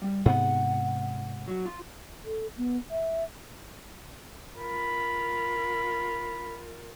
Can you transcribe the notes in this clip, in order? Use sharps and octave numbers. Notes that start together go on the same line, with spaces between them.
G3
G#2 C3 B3 F#5
F#3
F4
A4
B3
E5
F4 A#4 B5